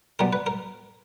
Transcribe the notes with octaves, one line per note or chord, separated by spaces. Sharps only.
B2 G3 B3 A#4
B4
A#4